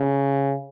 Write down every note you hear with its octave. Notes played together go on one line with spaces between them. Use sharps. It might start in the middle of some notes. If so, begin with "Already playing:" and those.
Already playing: C#3